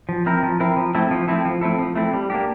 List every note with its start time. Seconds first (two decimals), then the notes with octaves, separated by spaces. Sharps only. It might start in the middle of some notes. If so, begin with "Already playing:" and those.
0.09 F3
0.26 C4 E4 A#4
0.43 F3
0.60 C4 E4 A#4
0.77 F3
0.95 A3 C4 E4 A4
1.11 F3
1.28 A3 C4 E4 A4
1.45 F3
1.61 A3 C4 E4 A4
1.79 F3
1.96 A3 C4 E4 A4
2.13 G3
2.30 A#3 D4 G4